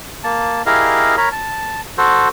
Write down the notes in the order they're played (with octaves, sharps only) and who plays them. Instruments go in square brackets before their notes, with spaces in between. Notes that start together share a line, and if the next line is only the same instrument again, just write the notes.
[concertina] A#3 A5
E4 G4 G#4 A#4 D#5 F5
A#4 C#5 A#5 B5
A5
F#4 A4 C5